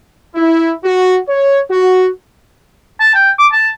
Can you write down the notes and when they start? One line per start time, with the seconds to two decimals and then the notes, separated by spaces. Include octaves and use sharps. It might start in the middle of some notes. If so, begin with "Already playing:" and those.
0.36 E4
0.84 F#4
1.29 C#5
1.71 F#4
3.00 A5
3.15 G5
3.39 D6
3.52 A5